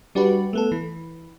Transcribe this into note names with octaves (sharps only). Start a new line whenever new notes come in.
G3 D4 F#4 G4 B4
A3 B3 A4
E3